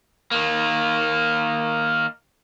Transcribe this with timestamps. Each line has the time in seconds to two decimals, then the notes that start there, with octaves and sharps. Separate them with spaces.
0.31 D#3 A#3